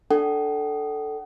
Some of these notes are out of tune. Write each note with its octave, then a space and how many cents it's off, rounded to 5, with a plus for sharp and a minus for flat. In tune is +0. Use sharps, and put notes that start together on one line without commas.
D4 +0 A4 +0 F#5 +40